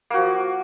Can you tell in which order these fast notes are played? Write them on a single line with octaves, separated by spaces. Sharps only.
A#3 F#4 F3